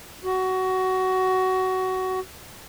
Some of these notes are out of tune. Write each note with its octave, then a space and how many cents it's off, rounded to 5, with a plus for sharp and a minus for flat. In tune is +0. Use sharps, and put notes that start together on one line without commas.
F#4 +15